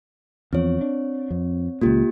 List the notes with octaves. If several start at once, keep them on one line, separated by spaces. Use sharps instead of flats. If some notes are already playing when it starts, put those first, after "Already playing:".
E2 F3 C4 C#5
D4
F2
C#2 A#2 A#3 F4 G4